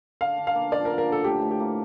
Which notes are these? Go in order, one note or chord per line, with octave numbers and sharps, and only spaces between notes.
D3 F5
D3
F5
A#3
F3 D5
A#4
D3
A#4
D3 A4
A2 G4
A2
G4
A#3